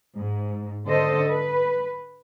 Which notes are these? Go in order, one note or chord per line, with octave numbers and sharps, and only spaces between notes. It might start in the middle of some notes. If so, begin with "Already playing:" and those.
G#2
D3 A4 C5 D#5
B4